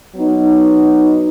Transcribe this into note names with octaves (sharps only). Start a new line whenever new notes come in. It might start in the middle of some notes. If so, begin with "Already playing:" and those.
F#3 B3 D#4